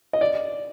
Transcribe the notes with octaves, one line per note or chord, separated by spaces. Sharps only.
D#5
D5